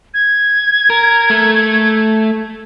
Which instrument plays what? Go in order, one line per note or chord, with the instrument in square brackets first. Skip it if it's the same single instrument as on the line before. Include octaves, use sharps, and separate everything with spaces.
[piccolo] G#6
[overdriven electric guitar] A#4
A3